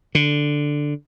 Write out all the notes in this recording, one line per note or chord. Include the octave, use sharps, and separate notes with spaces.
D3